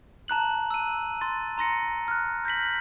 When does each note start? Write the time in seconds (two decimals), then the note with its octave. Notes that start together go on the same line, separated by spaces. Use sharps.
0.28 A5 A#5 F#6 F#7
0.71 E6 D#7
1.21 C6 A6
1.58 A#5 C6 A#6 C#7
2.08 F6 F#6
2.45 G6 A#6 B6 F#7